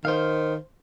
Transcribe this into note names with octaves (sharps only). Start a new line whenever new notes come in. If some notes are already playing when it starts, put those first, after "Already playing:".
D#3 C5 F5